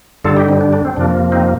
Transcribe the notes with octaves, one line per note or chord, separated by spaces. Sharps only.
G2 D3 G3 F4 A4
D#4 G4
C4 D#4
D4
D4
C4
F2 C3 F3 A#3 D4
C4 D#4